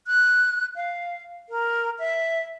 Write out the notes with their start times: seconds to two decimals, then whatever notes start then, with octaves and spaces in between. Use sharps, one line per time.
0.07 F#6
0.76 F5
1.49 A#4
1.99 E5